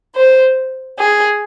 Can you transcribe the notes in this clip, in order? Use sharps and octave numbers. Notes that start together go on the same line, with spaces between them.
C5
G#4